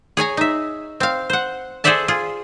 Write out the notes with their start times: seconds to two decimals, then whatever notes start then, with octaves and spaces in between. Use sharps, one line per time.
0.17 G#4 C#5 G#5 A#5
0.37 D#4 E5
1.00 C4 F5
1.30 C5 F#5
1.84 G#4 A4 C5 D5 E5 A5
2.08 F4 G#4